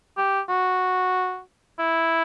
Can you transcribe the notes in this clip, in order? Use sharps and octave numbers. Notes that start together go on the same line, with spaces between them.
G4
F#4
E4